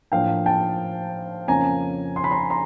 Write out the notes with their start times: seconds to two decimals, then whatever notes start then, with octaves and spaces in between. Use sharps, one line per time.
0.12 A2 F3 A#3 D4 F5 G5
0.46 G5 A5
1.48 F2 C#3 F3 A#3 C#4 G#5 A#5
2.16 C6
2.24 B5
2.31 A#5 C6
2.50 A#5 C6